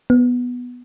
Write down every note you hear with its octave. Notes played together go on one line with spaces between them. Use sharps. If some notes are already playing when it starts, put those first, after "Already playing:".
B3